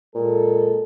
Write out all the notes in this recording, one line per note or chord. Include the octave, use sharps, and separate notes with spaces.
A#2 G#3 A4